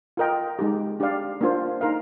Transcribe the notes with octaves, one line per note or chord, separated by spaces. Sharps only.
F4 A#4 D#5 G5
G#3 D#4 G4
D4 G4 D5 F5
A#3 D4 F4 C5
D#4 A#4 F5